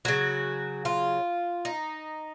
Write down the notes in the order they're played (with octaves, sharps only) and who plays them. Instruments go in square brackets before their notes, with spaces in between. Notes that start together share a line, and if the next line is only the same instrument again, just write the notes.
[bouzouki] C#3 F#3 F#4
F4
D#4